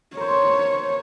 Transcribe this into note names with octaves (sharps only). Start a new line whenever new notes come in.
A#4 C5 C#5